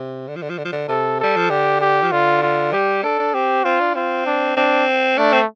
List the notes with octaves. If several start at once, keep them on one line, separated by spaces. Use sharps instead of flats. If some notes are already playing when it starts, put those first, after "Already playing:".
Already playing: C3
D3
F3
D3
F3
D3
F3
D3
C3 A4
G3 A4
F3
D3 G4
G4
F3
D3 F4
F4
G3 G4
D4 A4
D4
C4 G4
C4 F4
D4
C4 F4
D4
C4 D4
A3 D4
C4